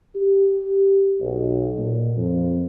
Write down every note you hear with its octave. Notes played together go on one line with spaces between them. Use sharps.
G4
B1
A#2
F2